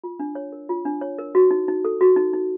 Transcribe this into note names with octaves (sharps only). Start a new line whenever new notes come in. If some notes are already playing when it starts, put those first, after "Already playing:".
F4
D4
C#5
A#4
F4
D4
C#5
A#4
F#4
D#4
D#4
A4
F#4
D#4
D#4